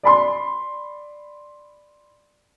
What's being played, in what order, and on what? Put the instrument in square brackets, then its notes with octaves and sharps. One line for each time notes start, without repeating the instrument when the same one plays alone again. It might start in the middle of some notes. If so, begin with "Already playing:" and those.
[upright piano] D5 B5 C6